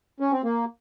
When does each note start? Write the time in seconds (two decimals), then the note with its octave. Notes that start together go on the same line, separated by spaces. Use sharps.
0.20 C#4
0.32 C4
0.44 A#3